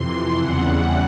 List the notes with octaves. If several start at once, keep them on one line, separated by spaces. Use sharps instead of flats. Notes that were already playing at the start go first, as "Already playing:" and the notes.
Already playing: F2 C3 E3 C6
E2 C#3 E3 G3 F#5